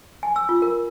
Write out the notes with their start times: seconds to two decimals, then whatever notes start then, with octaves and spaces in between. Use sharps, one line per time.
0.23 G#5
0.36 E6
0.49 F4
0.62 A#4